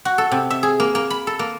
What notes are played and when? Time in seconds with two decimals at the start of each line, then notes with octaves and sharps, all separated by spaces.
0.05 F#4
0.18 A4
0.32 C3
0.50 E5
0.63 G#4
0.80 A#3
0.95 A#3
1.10 B5
1.27 A4
1.39 A#3